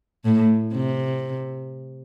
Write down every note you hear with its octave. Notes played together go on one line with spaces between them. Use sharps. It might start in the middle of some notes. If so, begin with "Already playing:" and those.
A2
C3